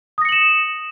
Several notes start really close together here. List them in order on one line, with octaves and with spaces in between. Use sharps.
D#6 A#6 C#7 F#7 E7